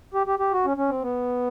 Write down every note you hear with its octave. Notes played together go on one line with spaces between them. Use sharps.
G4
G4
G4
F#4
C#4
C#4
C4
B3